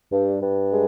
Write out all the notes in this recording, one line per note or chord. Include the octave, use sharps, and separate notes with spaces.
G2
G2
G#3